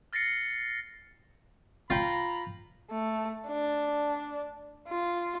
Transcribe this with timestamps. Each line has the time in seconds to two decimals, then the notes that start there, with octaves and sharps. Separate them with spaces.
0.13 F6 A6 A#6 C7 C#7
1.90 F4 G5 A#5 B5
2.90 A3
3.48 D4
4.89 F4